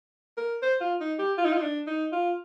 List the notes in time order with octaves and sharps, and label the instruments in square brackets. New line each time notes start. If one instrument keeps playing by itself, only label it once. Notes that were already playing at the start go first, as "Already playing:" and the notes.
[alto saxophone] A#4
C5
F4
D#4
G4
F4
D#4
F4
D#4
D4
D#4
F4